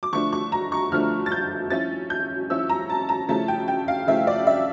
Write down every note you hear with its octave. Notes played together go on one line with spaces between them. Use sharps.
D6
D3 F3 A3 D4 C#6
C#6
A#5
C#6
D3 F3 A3 D4 F6
A6
G6
F3 C#4 E4 A6
G6
F3 C#4 E4 E6
A#5
A5
A#5
C#3 F3 A3 C#4 E4 A5
G5
G5
F5
C#3 F3 A3 C#4 E4 E5
D5
E5